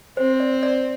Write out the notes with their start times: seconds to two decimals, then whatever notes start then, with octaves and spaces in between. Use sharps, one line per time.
0.17 C4 C5
0.40 D5
0.63 D5